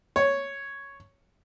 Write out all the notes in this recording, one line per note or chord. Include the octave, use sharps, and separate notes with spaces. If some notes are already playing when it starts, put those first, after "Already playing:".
C#5